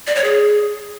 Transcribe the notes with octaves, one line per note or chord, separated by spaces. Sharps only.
D5
C#5
G#4